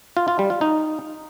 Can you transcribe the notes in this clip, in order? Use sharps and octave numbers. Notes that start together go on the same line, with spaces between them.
F4
F4
G3
F4
D#4